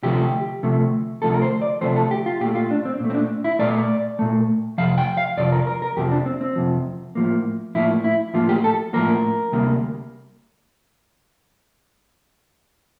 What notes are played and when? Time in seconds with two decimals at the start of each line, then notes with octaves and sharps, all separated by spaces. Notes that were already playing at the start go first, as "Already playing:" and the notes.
0.03 D2 C3 F3 A3 G4
0.63 D2 C3 F3 A3
1.22 D2 C3 F3 A3 A4
1.34 A#4
1.42 C5
1.62 D5
1.81 D2 C3 F3 A3 C5
1.96 A4
2.11 G4
2.26 F4
2.41 A#2 G4
2.44 A3
2.55 F4
2.71 D4
2.85 C4
3.00 A#2 A3
3.10 C4
3.15 D4
3.44 E4
3.59 A#2 A3 D5
4.19 A#2 A3
4.78 F2 C3 F3 F5
4.98 G5
5.17 F5
5.37 F2 C3 F3 D5
5.52 A#4
5.67 A#4
5.82 A#4
5.97 F2 C3 F3 G4
6.11 D4
6.26 C4
6.41 C4
6.56 F2 C3 F3
7.15 A2 F3 A#3
7.75 A2 F3 A#3 E4
8.04 E4
8.34 A2 F3 A#3 F4
8.49 G4
8.64 A4
8.93 A2 F3 A#3 A#4
9.52 D2 C3 G3 A#3